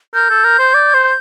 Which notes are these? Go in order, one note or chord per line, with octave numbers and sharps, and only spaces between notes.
A#4 G6
A4
A#4
C5
D5
C5